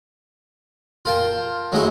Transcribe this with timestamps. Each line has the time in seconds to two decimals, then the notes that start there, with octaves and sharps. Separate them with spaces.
1.05 F4 A#4 F5 G5 A5
1.72 F#3 G#3 A3 D#4 E4 D#5